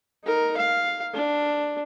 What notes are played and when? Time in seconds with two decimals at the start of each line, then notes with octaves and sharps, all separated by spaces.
0.24 D#4 A#4
0.57 F5
1.14 D4